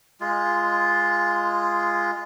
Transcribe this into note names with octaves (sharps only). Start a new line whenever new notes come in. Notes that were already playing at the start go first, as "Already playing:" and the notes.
G#3 F4